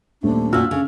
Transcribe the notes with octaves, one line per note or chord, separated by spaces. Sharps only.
D#1 A3 D4
A#2 F#4 E6 F6
C#3 D4